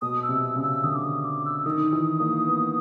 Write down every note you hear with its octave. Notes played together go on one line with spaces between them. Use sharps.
B2 D#6
E6
C3
E6
C#3
E6
D3 D#6
D6
D#6
D6
E6
D#3 D#6
E3
A#3
B3